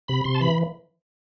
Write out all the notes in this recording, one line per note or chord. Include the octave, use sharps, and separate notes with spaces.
C3 B5
C3 C6
A5
E3 B5